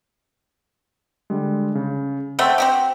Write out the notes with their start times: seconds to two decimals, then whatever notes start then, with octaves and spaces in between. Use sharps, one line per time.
1.30 D3 G3 G#3
1.75 C#3
2.39 A3 C4 E5 F#5 C6 C#6
2.58 C4 F#4 G4